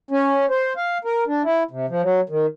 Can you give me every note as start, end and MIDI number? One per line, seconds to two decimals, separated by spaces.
0.11 0.46 61
0.50 0.73 72
0.77 0.98 77
1.05 1.24 70
1.27 1.42 62
1.44 1.63 64
1.71 1.86 48
1.89 2.02 53
2.02 2.20 54
2.29 2.46 51